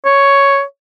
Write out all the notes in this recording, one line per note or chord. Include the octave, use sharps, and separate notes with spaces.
C#5